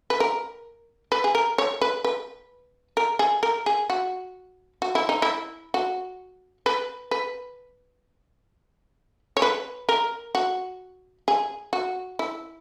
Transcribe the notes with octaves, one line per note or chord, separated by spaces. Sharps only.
B4
A#4
B4
G#4
A#4
C#5
B4
B4
A#4
G#4
A#4
G#4
F#4
F#4
E4
D#4
E4
F#4
B4
B4
C#5
B4
A#4
F#4
G#4
F#4
E4